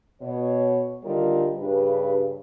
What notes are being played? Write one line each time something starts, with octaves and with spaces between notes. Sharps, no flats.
B2 C#5
D3 D#3 G3 D#4 F4 A#4
G2 C#3 D4 G4 B4